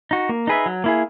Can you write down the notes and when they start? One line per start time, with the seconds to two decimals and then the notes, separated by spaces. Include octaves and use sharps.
0.11 D#4 F#4
0.29 A#3
0.47 D#4 G#4 B4 E5
0.66 F#3
0.84 A#3 E4 G#4